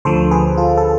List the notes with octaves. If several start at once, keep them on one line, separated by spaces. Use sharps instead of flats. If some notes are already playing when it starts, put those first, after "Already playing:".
D2 D3 F3 A4 C5
G#4 B4
F4 A4
A4